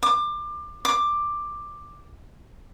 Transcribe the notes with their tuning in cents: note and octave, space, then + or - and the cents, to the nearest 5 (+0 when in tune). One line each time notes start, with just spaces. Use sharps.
D6 +25
D6 +10